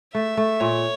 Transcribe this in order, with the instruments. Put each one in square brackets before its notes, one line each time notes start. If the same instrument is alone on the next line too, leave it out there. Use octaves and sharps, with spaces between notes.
[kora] A3 [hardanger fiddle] E5
[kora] A3
[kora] A#2 [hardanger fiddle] C#5